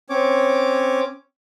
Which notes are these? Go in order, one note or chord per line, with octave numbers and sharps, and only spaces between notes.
C4 C#4 C#5 D6